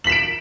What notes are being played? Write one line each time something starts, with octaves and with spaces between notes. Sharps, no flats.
B6 D7 E7 F#7